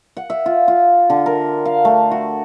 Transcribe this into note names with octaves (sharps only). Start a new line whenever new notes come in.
F#5
E5
F4
F4
D3
A#4
F5
A3
F#4